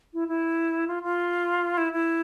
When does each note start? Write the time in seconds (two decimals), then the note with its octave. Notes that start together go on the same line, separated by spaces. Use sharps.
0.13 E4
0.28 E4
0.87 F4
1.03 F4
1.78 E4
1.93 E4